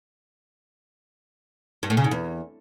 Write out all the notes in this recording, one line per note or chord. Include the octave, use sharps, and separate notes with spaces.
G2
A2
C#3
G#2
E2